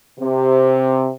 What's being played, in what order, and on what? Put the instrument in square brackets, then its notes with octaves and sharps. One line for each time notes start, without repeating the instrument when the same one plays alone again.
[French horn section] C3